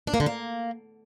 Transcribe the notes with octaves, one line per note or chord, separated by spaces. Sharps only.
D4
A#3
D3
A#3